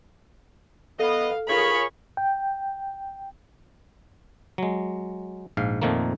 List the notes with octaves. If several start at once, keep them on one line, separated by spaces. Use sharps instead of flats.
B3 A4 D#5 F5
F4 G#4 A#4 C#5 B5
G5
F#3 G#3
A#1 G#2 F5
F2 A#2 D#3 F3 A3 A#3